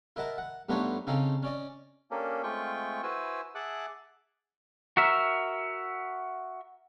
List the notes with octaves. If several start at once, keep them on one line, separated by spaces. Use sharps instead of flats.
E4 A#4 D#5 F#5 A5 A#5
F#5
G2 A3 B3 D#4 C5 C#5
C#3 C4 C#4 D#4 A4
C#4 D5 D#5
A#3 C#4 D4 G4 A4 A#4
G#3 A3 C4 F4 G5 C#6
E4 F#4 B4 C5 G#5 E6
G#4 E5 F#5 A5 D6 F#6
F#4 A#4 E5